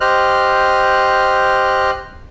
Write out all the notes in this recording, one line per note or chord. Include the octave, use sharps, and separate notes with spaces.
G4 C5 D#5 F6 F#6